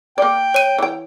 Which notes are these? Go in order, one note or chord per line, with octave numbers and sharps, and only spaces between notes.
A#3 D5 G5
C#5 D#7
E3 G5